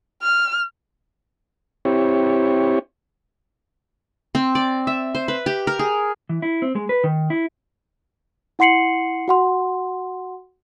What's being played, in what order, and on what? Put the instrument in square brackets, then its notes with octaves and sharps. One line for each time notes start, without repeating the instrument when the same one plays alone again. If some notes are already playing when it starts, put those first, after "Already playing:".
[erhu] F6
[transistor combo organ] C4 E4 G4 C#5
[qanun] C4
D5
E5
C5
B4
G4
A#4
G#4
[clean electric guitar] E3
E4
C4
G#3
B4
D#3
E4
[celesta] E4 F#5 C6 C7 C#7 F#7
F#4 F#5 C6